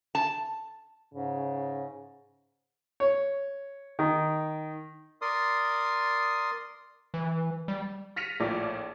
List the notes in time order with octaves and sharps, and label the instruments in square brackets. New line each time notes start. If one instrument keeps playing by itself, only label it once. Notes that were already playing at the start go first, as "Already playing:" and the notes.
[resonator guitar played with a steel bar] A5
[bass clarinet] G#2 [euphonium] C#3
[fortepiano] C#5
D#3
[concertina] A#4 D5 C6 D#6
[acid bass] E3
G3
[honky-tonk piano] F6 A#6 B6 C#7 D#7 F7
A#1 A2 F3 D5 D6